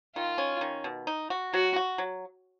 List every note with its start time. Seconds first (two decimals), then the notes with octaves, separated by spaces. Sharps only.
0.16 D#3 F4
0.38 C#4
0.61 D#3
0.84 B2
1.07 D#4
1.30 F#4
1.53 F#3 F#4
1.76 F#4
1.98 F#3